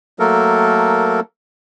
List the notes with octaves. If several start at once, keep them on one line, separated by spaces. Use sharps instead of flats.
F#3 A3 A#3 A4 A#4